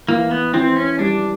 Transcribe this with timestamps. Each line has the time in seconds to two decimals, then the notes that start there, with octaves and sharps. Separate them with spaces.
0.08 E3 A#3
0.31 B3
0.53 E3 C4
0.76 C#4
0.99 G3 D4